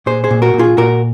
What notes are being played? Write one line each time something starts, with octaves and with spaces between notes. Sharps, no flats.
A#2 G#4 C5
G#4 C5
A#2
F#4 A#4
A#2
F4 G#4
A#2 F#4 A#4